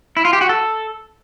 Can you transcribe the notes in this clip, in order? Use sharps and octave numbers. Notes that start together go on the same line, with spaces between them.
E4
F4
G4
F#4
A4